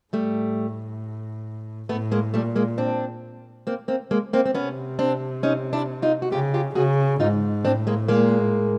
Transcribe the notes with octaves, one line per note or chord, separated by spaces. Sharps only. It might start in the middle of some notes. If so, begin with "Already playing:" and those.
A2 G3 A3
A2 A3 B3
G#3 A#3
A#2 G3 A3
G#3 A#3
C4 D4
A#3 C4
A#3 C4
G#3 A#3
A#3 C4
C4
C3 B3 C#4
C4 D4
C#4 D#4
D4 E4
D#4 F4
F#4
C#3 F4 G4
F4 G4
C#3 F#4 G#4
G#2 D#4 F4
A2 C4 D4
G#3 A#3
A#2 G#3 A#3
A2